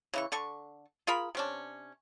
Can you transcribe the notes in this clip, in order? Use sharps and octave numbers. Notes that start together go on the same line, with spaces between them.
C#3 E3 C#6
D3 A4 C#6
F4 G#4 A#4 B5
C3 C#4 D4